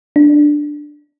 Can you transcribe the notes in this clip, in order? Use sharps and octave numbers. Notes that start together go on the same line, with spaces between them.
D4